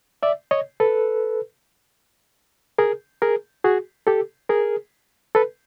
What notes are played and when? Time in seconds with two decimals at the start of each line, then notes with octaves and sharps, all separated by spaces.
0.23 D5 E5
0.51 C#5 D#5
0.80 A4 B4
2.78 G#4 A#4
3.22 G#4 A#4
3.64 F#4 G#4
4.07 G4 A4
4.49 G#4 A#4
5.35 A4 B4